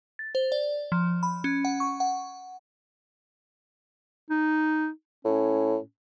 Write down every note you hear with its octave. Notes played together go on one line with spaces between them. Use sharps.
A6
C5
D5
F3
B5
C#4
F#5
C#6
F#5
D#4
A2 C#4